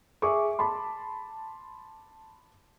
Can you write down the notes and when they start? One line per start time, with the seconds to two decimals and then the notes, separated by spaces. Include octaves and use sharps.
0.22 G#4 E5 C#6 D6
0.59 A5 B5 C6